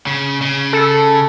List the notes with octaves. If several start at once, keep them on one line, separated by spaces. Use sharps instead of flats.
C#3
C#3
A4